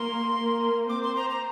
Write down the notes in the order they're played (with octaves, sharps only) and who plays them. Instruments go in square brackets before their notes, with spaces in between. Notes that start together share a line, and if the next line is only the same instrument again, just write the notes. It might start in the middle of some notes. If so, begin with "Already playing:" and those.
Already playing: [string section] A#3 A#4 [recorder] C6
[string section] A#3 A#4
[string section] C4 C5 [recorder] D6
[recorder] C6
A#5
A#5